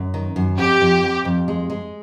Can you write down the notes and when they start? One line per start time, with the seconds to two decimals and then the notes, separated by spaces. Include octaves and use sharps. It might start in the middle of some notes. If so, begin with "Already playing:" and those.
Already playing: F#2
0.14 D#3
0.36 F#2
0.59 F2 G4
0.81 F2
1.03 F2
1.25 F2
1.48 G#3
1.70 G#3